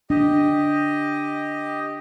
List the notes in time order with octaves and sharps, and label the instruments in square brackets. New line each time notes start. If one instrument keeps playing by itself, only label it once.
[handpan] D4 [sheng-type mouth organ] G4 D#5